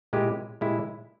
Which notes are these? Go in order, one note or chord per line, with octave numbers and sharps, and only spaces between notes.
A#2 G#3 E4 G4
A#2 G#3 E4 G4